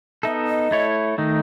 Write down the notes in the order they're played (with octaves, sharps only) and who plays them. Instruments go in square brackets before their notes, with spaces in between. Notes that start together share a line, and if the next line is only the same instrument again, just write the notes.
[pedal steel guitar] B3 D#4 A4 [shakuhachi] E5
[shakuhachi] D#5
[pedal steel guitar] A3 E4 A4 C#5
D#3 A3 D#4